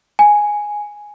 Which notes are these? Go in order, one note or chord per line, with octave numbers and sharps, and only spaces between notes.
G#5